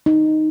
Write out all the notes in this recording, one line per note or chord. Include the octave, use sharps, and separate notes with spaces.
D#4